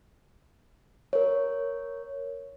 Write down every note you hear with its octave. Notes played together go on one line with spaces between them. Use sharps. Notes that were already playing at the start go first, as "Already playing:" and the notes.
A#4 C#5